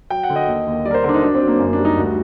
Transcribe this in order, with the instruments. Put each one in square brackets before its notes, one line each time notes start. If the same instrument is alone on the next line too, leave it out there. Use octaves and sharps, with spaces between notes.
[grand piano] F#3 G5
F#5
D3
D#5
D#2
D#2
G3 D5
A#4
C5
D3 A#4
D4
D#4
F#3 D4
C4
F#3
A#3
F#2 A#3
D4
G3
D#4
D2 F#4